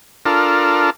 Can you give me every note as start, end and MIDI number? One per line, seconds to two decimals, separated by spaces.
0.25 0.90 62
0.25 0.90 65
0.25 0.90 69
0.25 0.90 70